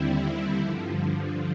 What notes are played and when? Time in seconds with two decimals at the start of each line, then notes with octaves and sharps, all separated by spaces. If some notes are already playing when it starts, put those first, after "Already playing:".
Already playing: D#2 D3 G3 C4 E4
0.58 G2 D3 F3